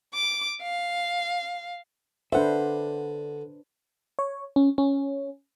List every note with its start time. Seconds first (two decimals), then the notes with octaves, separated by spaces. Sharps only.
0.14 D6
0.62 F5
2.33 D3 D4 B4 C5 E5 F#5
4.19 C#5
4.56 C#4
4.78 C#4